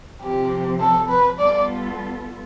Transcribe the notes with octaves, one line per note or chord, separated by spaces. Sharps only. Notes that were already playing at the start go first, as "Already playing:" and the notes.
C3 F3 C4 G4
A4
B4
G3 B3 F4 A4 D5